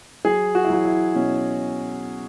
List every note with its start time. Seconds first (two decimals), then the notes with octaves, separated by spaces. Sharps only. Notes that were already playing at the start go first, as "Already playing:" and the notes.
0.25 F#3 G#4
0.55 F#4
0.64 E4
0.70 F#3 F#4
0.85 E4
1.15 B2 C#4